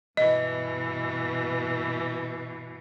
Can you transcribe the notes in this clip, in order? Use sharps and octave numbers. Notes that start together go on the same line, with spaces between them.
G2 B2 E3 D#5